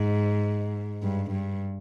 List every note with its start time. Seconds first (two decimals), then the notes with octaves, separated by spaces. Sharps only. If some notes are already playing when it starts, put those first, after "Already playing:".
Already playing: G#2
1.03 G2
1.31 G2